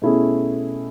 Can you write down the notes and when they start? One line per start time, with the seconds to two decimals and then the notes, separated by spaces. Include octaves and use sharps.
0.02 B2 A3 C#4 E4 G#4